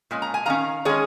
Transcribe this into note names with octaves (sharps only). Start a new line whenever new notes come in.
A#2 G#3 C#4
A#5
G#5
D#3 C#4 F5 A#5
D#3 G#3 C#4 G#4 C#5